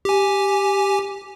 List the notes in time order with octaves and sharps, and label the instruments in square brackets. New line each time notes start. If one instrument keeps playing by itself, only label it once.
[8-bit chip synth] G4 G#5